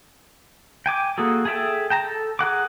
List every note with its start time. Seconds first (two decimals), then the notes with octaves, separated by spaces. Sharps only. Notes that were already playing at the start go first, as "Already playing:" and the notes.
0.86 G5 G#5 D6
1.18 A#3 F#4 G#4 A4
1.45 G#4 A4 E5 G5 A5
1.90 G5 A5 A#5
2.04 A4
2.39 G#4 A#4 F#5 D6